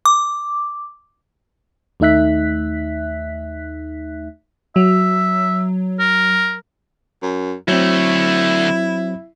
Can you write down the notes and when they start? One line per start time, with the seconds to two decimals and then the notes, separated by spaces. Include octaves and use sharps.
0.05 D6
2.00 D#2 A3 D#4 E5 F#6 B6
4.76 F#3 E5
6.00 A#4
7.22 F#2
7.68 D2 F#3 A3 C4 E4